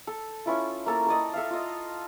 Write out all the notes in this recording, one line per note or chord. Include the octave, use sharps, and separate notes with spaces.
A4
C#4 E4 F4
A#3 A4 A#4
A4 D5 D#5
A4 E5 F5
F4 D#5